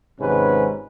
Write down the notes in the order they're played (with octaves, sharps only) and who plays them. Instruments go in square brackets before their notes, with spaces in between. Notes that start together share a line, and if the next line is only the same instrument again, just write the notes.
[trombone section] G#1 G#2 C3 C#4 B4